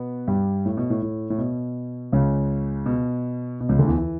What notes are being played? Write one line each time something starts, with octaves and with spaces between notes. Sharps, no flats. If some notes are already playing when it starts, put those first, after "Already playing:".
Already playing: B2 B3
G2 G3
A2
B2
A2
A2
A2
B2
C#2 C#3
B2
B2
C#2 C#3
D2 D3
E2 E3
E3